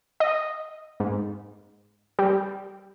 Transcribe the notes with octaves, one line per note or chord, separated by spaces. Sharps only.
D#5
G#2
G3